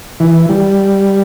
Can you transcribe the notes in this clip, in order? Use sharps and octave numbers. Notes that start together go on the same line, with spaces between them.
E3
G3